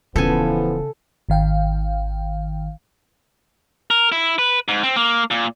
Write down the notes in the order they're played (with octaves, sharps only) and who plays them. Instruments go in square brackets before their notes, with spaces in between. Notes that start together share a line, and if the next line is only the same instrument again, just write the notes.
[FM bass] D#1 [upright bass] C#3 [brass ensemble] E3 F3 B3 [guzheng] A4 G#5
[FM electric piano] G#1 D#3 F5 G5
[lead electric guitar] A#4
E4
B4
G#2
C4
A#3
A#2